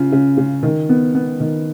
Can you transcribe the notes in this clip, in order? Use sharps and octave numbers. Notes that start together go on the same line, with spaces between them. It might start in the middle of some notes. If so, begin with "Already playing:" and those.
Already playing: C#3 F4
C#3
C#3
D#3
B3
B3
D#3